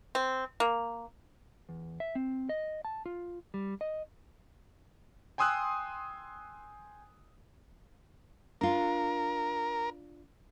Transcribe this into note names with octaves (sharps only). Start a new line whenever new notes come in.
C4
A#3
E2
E5
C4
D#5
A5
F4
G3
D#5
G5 G#5 C6 D#6 E6 F#6
D4 F4 A#4